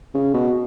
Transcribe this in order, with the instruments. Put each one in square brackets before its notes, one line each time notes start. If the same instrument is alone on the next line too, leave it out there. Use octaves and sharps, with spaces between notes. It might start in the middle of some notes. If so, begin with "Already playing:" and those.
[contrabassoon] C#3
B2